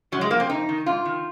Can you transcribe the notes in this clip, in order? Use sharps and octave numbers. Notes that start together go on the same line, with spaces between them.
F#2 F#3
G#3
F3 A#3
C4
F2 D#4
D#3
G#2 F4
D#3